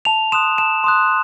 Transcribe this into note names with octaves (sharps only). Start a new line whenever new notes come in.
A5 F7
C6 D#6 F#6 E7
A5 E7
C6 D#6 F#6